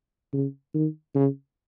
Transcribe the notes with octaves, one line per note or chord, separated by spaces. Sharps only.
C#3
D#3
C#3